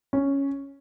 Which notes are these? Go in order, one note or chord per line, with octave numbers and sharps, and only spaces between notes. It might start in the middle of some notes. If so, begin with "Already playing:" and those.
C#4